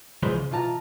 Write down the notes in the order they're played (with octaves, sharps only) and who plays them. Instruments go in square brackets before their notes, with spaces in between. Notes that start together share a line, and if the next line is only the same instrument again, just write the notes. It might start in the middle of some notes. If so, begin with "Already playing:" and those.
[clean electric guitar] C2 E3 F3 G#3 E4 C5
C#3
B2 E3 F4 A5 A#5